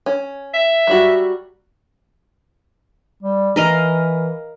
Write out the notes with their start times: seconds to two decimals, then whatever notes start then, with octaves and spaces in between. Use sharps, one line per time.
0.06 C#4
0.54 E5
0.87 F#3 G3 F#4
3.23 G3
3.56 E3 A#4 D#5 F5